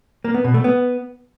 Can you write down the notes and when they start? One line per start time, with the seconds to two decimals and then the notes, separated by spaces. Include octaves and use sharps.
0.24 A#3
0.34 B3
0.44 B2
0.54 A3
0.64 B3